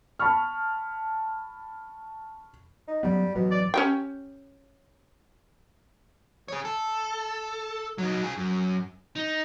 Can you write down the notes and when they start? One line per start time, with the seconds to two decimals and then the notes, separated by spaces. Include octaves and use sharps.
0.19 A5 B5 C#6 F6
2.87 D#4
3.03 F#2 F#3 G3 B3
3.35 A1 B2 F#3
3.51 D5
3.74 C#4 G4 G5
6.48 G#4 C#5
6.65 A4
7.98 F#3 D#4
8.23 F4 G#4
8.37 F#2
9.16 D#4